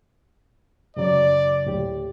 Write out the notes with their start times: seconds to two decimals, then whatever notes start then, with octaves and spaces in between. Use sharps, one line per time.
0.96 F#2 C#3 F#3 D5
1.65 D2 A2 G4